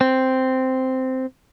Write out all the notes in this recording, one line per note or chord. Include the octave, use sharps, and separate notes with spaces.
C4